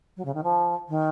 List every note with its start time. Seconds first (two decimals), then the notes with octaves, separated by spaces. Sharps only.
0.17 F#3
0.25 C#3
0.34 D#3
0.43 F3
0.89 D#3